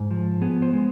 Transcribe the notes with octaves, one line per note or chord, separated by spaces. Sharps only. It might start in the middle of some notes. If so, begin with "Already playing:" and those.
Already playing: G#2
F3
B3 G#4
C5
G#3